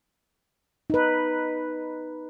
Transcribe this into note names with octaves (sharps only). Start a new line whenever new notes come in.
D#4 B4